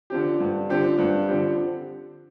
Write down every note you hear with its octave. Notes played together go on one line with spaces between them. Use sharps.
D3 F3 C4 G4
G2
D3 F3 C4 G4
G2
D3 F3 C4 G4